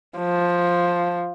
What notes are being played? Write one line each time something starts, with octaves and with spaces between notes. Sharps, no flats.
F3